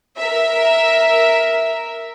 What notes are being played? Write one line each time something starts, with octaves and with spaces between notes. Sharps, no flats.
A#4 E5